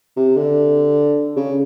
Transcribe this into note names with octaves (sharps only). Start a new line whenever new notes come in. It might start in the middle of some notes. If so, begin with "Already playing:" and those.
C3
D3
C#3